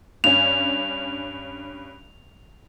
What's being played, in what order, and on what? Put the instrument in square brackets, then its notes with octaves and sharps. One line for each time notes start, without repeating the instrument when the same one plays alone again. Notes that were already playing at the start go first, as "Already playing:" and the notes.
[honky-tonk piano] G2 C#4 [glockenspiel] F7